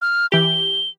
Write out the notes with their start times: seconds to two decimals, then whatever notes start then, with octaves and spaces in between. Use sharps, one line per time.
0.02 F6
0.32 E3 G4 G7